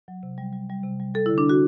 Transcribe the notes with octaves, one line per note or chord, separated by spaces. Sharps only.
F#3
C3
G3
G3
G3
C3
G3
G3 A4
E4
D3
D4
D3 F#4